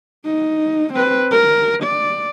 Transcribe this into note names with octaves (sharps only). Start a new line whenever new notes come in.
D#4
C4 B4
A#4
D5